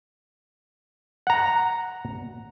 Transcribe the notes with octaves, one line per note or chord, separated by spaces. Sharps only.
F#5 A#5